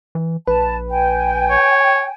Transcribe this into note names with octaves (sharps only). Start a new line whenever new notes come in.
E3
A#1 B4 A5
G5 G#5
C#5